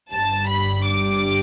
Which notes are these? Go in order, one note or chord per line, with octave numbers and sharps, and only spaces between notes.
G1 G2 G3 A5
B5
D6